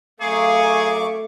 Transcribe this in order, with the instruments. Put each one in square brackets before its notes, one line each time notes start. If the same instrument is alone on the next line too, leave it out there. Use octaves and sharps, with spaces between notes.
[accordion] F#2 C#6 D6 [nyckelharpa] A3 [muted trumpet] G#4 [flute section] F5 G#5 A#5